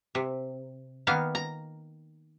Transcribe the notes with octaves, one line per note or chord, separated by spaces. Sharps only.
C3
D#3 A#3 B3 F5
A#5